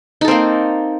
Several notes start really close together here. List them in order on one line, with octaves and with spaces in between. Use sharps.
D#4 A4 C4 A#3